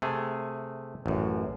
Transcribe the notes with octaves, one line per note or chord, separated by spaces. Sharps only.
C3 A3 G#4
A1 F#2